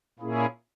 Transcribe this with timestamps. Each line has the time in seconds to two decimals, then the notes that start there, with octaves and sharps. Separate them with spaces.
0.19 A#2 A#3 C#4 E4 G#4